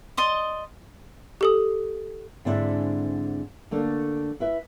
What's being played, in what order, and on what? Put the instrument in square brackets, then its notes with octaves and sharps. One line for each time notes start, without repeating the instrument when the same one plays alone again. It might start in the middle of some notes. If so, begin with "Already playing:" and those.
[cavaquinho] D5 D#5 C6 D#6
[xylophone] G4 A4 D#6
[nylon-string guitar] G#2 D3 G#3 C4 D4 E4
D3 A3 A#3 D4
E4 B4 E5